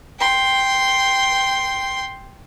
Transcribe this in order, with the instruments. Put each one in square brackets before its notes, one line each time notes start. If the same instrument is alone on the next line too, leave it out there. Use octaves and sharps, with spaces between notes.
[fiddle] G5 C6